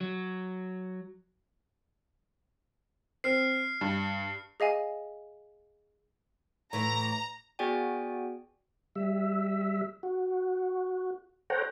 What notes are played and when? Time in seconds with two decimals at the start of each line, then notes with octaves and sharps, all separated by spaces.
0.01 F#3
3.24 C4 F6 C7
3.81 G2
4.60 G#4 D#5 F5 G#5
6.73 A2 E3 A#5
7.59 B3 F#4 G#4 D5 G5 G#5
8.95 G3 E5
10.03 F#4
11.50 A4 C5 C#5 F#5 G5 A#5